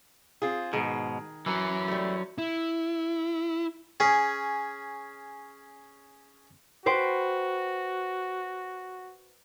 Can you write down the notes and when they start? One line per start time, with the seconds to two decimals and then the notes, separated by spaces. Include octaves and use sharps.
0.42 C4 F4 G#4
0.73 G#2 B2 D#3 G#4
1.46 E3 F#3 A#4
1.88 G3 A3
2.38 E4
4.00 C#4 G#4
6.86 F#4 B4 C5 G5